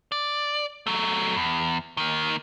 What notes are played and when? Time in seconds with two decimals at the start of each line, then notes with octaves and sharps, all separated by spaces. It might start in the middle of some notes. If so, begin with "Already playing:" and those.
0.12 D5
0.87 F#3 A3
1.36 E2
1.97 D#3 A#3